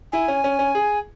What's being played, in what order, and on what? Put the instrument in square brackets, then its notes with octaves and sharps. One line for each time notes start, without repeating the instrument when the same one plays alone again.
[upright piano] E4 [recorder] G#5
[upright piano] C#4
C#4
C#4
G#4